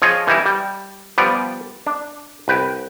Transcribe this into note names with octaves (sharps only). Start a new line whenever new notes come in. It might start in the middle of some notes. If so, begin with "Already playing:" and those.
F3 F4 G#4 C#5 D#5
E3 G3 D#4 E4
G3
F3 G3 B3 B4 D5
D4
C2 B4 G5